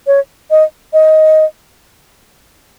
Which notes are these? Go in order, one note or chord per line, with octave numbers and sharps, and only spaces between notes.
C#5
D#5
D#5